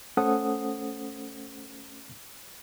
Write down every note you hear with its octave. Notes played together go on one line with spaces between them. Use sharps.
A3 C#4 A4 C5 F#5 D#6